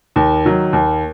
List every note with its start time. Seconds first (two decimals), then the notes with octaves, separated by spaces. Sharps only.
0.16 D#2
0.45 D#3 F#3
0.73 D#2